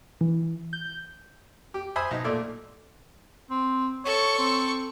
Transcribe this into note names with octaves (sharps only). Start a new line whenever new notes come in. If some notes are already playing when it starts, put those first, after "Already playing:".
E3
G6
G4
C5 E5 G#5 B5 C6 D#6
B1 D#4
A#2 A3 D5 E5
C4
A4 C#5 C#6
C4